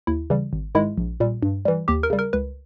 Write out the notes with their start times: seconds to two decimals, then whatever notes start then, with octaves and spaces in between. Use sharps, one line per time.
0.07 D#2 E4
0.30 C#3 E3 G3
0.53 G#1
0.75 G#2 D#3 G#3 E4
0.98 A#1
1.20 A#2 G3
1.43 G2
1.65 E3 G3
1.88 D#2 G4
2.03 A#4
2.10 C#3 G3
2.19 A#4
2.33 C#2 B4